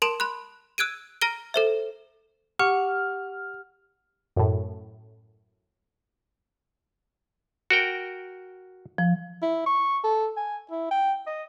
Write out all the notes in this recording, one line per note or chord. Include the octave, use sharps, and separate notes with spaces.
A#4 A5 C6 D7 E7 F#7
B5 C6 F#6
E6 F#6 G#6 D7 D#7
A#5 F6 A#6 D7 G7
A4 C5 E5
G4 F#5 C#6 F6
F#2 A2
F#4 A#4 G5
F3
E4
C#6
A4
G#5
E4
G5
D#5